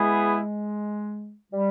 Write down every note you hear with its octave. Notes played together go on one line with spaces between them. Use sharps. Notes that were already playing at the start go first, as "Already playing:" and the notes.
Already playing: G#3 B3 E4 G#4
G3